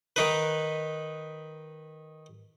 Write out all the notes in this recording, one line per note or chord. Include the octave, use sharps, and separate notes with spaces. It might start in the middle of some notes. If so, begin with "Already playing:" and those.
D#3 D#4 B4